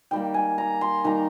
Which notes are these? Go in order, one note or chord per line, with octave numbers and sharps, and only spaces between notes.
D#3 G3 A#3 G5
G#5
A#5
C6
D#3 G3 A#3 A#5